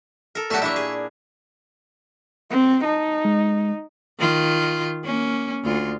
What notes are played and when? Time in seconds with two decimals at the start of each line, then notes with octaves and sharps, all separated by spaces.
0.35 A4 A#4
0.50 A#2 F#3 A3 F#4 G4
0.62 A#3 D4 E4 E5 C#6
0.76 G#4
2.51 C4
2.85 D#4 A5
3.25 G#3
4.19 D#3 F4
5.04 A#3 C#4
5.64 D2 F4